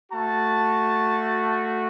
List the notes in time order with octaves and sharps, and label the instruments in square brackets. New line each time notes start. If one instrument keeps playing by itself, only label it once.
[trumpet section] A3 F#4 A5